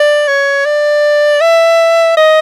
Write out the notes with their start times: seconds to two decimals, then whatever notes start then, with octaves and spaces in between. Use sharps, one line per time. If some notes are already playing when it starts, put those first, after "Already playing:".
Already playing: D5
0.28 C#5
0.65 D5
1.41 E5
2.17 D#5